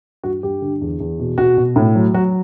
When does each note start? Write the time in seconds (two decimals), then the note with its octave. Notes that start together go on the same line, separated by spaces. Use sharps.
0.23 G2 F#4
0.43 G2 G4
0.62 D3
0.81 E2
1.00 E2
1.19 B2
1.38 B2 F#4
1.57 B2
1.76 A2
1.95 F#3
2.14 F#3 F#4